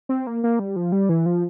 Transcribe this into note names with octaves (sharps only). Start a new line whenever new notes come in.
C4
A#3
A#3
G3
F3
G3
E3
F3